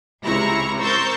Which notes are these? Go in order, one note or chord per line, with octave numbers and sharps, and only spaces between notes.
C#2 C3 E4 A#5 C#6
A#4 C5 C#6 E6 G6 A6